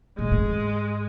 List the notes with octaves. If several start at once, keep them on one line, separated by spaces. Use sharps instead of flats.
A#2 G#3
A2
G#2